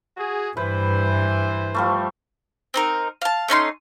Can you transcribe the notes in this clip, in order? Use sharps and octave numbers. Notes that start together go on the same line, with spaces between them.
F#4 G#4
G2 E3 B4 C5
F3 G3 A3
C4 D#4 A#4
F5 A5
A3 C#4 D#4 C6